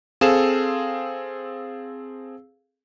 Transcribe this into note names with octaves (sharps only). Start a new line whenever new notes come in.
C4 G#4 A4 F5 E7